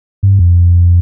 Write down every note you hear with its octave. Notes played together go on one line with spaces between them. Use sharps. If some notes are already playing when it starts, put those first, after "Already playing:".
G2
F2